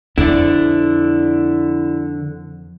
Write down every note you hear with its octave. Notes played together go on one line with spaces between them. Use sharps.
F2 D3 E4 D5